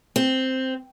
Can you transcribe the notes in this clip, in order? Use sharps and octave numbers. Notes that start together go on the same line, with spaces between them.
C4